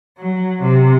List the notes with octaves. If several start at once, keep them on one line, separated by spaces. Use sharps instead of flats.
F#3
C3